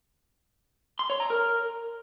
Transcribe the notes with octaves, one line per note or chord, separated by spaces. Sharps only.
C6
C#5
A#5
A#4